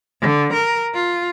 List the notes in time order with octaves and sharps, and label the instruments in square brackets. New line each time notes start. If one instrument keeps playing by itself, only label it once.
[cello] D3
A#4
F4